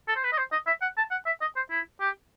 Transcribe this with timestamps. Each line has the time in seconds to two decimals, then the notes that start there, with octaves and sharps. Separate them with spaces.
0.08 A4
0.16 C5
0.23 B4
0.32 D#5
0.38 C5
0.52 D#5
0.67 E5
0.82 F#5
0.97 A5
1.11 F#5
1.26 E5
1.41 D#5
1.56 C5
1.70 E4
2.00 G4